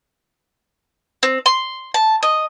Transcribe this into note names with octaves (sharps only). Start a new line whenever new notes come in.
C4
C6
A5
D#5